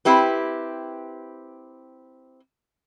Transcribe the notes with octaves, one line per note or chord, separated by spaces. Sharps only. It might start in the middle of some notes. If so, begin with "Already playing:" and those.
C4 E4 G4 B4